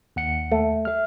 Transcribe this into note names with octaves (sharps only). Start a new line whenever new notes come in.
D#2 F#5 C#7
A3
E5 F6